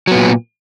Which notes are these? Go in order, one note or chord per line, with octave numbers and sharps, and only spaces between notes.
A#2 F#3 B3